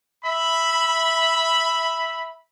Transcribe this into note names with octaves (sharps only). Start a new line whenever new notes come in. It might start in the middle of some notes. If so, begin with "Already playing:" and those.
E5 B5